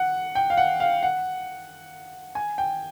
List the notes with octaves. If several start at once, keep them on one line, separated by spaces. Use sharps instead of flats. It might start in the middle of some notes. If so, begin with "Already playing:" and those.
Already playing: F#5
G5
F5
F#5
F5
F#5
G#5
G5